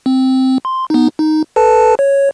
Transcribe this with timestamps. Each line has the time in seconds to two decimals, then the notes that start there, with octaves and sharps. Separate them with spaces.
0.06 C4
0.65 C6
0.90 B3 D#4
1.19 D#4
1.56 A4 B4 A5
1.99 C#5